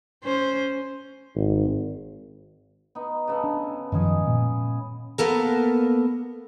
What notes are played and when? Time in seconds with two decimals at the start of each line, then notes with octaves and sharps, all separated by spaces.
0.24 C#4 C5
1.35 G#1
2.95 B3 D#4
3.28 C#3 B3 A4
3.44 D4
3.92 F#2 D#3 F3 G#3 C#4 G#4
4.27 A#2
5.18 A#3 B3 A4 A#4